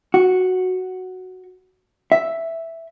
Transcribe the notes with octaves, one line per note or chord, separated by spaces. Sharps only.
F#4
E5